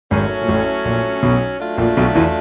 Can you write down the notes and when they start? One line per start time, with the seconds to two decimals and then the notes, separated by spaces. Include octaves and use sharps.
0.11 G#1 G#2 F#3 A3 C#4
0.41 A#2
0.48 A1 A2
0.85 A#1 A#2
1.23 B1 B2
1.59 F#3 A3 D4 F4
1.78 A#1 A#2
1.97 B1 B2
2.15 E2 E3